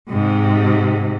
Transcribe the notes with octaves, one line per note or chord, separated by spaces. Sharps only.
G#2 C3